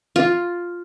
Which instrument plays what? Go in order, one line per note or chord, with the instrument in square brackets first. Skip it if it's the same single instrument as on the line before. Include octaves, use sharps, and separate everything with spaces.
[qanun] F4